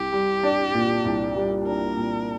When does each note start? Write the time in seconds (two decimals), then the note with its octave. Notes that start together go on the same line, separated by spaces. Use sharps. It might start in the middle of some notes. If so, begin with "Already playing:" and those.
Already playing: C2 G4
0.12 G3
0.43 D4
0.74 A#2
1.05 C2
1.36 G3
1.66 D4 A#4
1.97 A#2